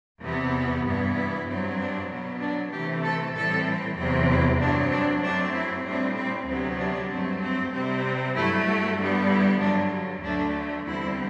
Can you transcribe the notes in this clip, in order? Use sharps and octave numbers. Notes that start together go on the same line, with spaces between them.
E2 C3 E3 B3
G2 E3 B3
E4
G2 F#3 C4
D4
B2 F#3 B3
D4
C3 E3 A3 C4 G4
A4
A2 E3 G3 C4 A4
E2 C3 F#3 C4
E4
G2 F#3 C4 D4
D4
F#2 F#3 A3 C4 D4
E4
A2 G3 C4 D4
C4
D2 C3 F#3 B3 C4
D4
G2 F#3 A3 C4
C4
C3 G3 C4
G2 F#3 A3 E4
F#4
G2 D3 G3 B3
E4
G2 D3 F#3 D4
D2 D3 F#3 A3 D4
E2 D3 G3 C4 E4